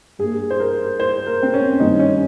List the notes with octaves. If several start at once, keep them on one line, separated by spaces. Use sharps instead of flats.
G2 G3 A#3 G#4
C5
A#4
C5
A#4
C4
C#4
G2 D#3 G3 A#3 D#4
C#4